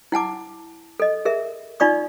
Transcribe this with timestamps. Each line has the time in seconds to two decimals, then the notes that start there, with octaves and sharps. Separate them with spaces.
0.12 E4 F#5 A5 D6
1.00 A4 D#5
1.25 G#4 A#4 E5
1.80 D#4 F4 D5 C#6 D#6